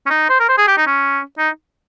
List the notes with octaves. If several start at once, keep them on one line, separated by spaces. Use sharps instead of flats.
C#4
D#4
C5
A#4
C5
G#4
G4
D#4
C#4
D#4